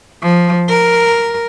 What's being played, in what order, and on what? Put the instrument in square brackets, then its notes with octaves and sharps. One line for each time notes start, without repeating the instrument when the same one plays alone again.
[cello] F3
A#4